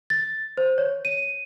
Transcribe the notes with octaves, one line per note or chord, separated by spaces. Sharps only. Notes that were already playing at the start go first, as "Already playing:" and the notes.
A6
C5
C#5
D#7